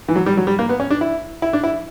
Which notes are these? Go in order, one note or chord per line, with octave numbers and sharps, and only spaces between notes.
E3
F#3
G3
F#3
G3
A#3
B3
C#4
D4
E4
E4
D4
E4